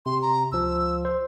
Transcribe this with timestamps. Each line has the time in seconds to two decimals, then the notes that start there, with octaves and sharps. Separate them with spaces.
0.06 C3 C6
0.22 A#5
0.52 C#2 F3 E6
1.05 C5